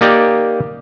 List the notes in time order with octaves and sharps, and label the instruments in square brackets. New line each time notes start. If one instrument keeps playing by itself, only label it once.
[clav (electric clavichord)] A#3 D#4 G4 D5